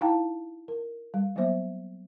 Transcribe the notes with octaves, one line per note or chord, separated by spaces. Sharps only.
D#4 E4 F5 G5 A5 A#5
A#4
G3
F#3 A#3 B3 C5 E5